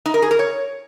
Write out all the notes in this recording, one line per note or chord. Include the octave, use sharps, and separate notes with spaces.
D#4
A#4
G#4
A#4
C#5